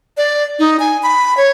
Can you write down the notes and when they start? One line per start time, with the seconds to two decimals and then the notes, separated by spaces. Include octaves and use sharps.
0.17 D5
0.59 D#4
0.80 G#5
1.03 B5
1.37 C#5